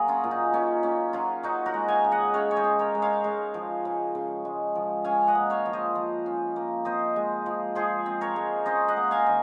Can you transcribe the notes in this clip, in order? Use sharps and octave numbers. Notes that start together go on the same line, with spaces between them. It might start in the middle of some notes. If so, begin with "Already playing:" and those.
Already playing: F#3 A#3 G#4 A#4
C#4 F4
A#2
D#4
A#2 C#4
A#3 C#4
F#3 C#4 F4
C#4 D#4 F#4
F#4 A#4
G#3
F5 G#5
C#3
D#5 F#5
C#3 C#5 F5
C#5
C5 D#5
C#4
A#4 C#5
G#3
C#5 F5
G#3
F3
C#3
C#3
G#3
F3
C#4 F5 G#5
D#5 F#5
A#3
C#5 F5
F3
C5 D#5
F3
C#4
A#3
C4 C5 D#5
G#3
F3
F3 G#4 C5
C4
A#4 C#5
G#3
C#4 C5 D#5
D#5 F#5
A#3
F5 G#5
D#3